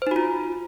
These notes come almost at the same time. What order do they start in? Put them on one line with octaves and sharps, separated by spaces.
C5 D#4 F#4 F4